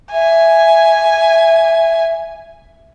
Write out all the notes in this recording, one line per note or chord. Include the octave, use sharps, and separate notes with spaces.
E5 G#5